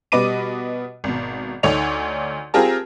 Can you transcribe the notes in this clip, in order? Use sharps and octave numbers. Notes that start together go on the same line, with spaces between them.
B2 G3 B4 D#5 D6 D#7
G#1 B2
D2 D#4 A4 C#5 D5 F7
C4 F4 G4 G#4 A#4 A5